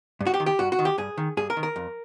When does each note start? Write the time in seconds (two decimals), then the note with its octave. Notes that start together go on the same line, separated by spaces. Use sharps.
0.21 G2
0.27 F#4
0.34 G4
0.40 D#3
0.46 G4
0.59 G2 F#4
0.72 F#4
0.79 D#3
0.85 G4
0.98 G2 G#4
1.18 D#3
1.37 G2 G#4
1.50 A#4
1.57 D#3
1.63 A#4
1.76 F2